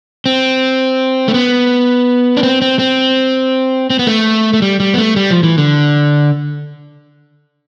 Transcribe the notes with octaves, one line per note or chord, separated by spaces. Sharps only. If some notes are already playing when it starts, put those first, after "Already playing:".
C4
A3
B3
D4
C4
C4
C4
C4
B3
A3
A3
G3
G3
B3
A3
G3
F3
E3
D3